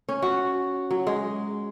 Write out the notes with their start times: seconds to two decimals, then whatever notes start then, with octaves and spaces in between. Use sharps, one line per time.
0.09 C#4
0.22 F#4
0.91 F#3
1.07 G#3